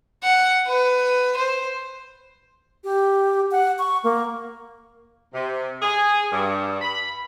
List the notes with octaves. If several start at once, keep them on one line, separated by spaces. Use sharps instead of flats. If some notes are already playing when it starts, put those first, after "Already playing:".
F#5
B4
C5
G4
F#5
C#6
A#3
C3
G#4
G2
B5